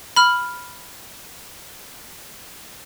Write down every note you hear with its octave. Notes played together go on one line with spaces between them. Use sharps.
B5 F6